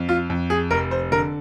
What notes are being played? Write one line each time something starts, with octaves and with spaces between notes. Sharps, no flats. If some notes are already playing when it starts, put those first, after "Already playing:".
Already playing: F2
F4
F2
G#4
F1 A#4
C5
D3 A#4